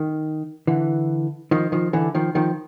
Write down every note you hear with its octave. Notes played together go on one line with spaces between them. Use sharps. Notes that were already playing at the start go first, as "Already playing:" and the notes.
Already playing: D#3
D3 E3
D#3 F3
D#3 F3
D3 E3
D#3 F3
D#3 F3